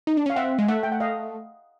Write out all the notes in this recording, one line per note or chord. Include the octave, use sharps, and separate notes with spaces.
D#4
D4
C#4 F5
C4 E5 F#5
G#3
A3 E5 F#5
G5
F#5
D#5 F5